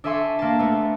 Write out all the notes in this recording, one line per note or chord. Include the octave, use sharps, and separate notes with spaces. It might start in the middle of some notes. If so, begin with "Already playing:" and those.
D4 A4 E5 G#5 C6 C#6
A#3 A5
A3 B3